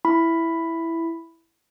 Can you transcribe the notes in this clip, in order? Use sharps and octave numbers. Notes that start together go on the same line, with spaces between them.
E4 B5